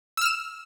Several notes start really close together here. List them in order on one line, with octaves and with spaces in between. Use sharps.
E6 F6 E7